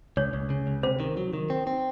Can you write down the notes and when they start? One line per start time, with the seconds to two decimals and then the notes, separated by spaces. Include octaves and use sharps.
0.17 C#2 C#5
0.34 C#2
0.50 C#3
0.67 C#2
0.83 C3 C5
1.00 D#3
1.17 F#3
1.33 D#3
1.50 C4
1.67 C4